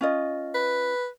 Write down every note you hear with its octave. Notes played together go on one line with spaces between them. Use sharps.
C#4 F4 D#5
B4